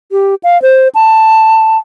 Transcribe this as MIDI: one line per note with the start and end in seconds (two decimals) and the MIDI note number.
0.12 0.35 67
0.43 0.61 77
0.62 0.88 72
0.95 1.78 81